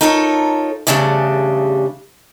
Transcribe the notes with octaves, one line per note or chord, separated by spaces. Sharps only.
D#4 F4 A4 A#4 C#5
E2 G2 C#3 G3 A3 D4